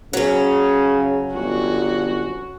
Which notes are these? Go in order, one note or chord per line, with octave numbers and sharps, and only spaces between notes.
C#3 F#3 C#4
G1 F#4